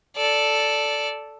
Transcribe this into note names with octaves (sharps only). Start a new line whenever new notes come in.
A4 D5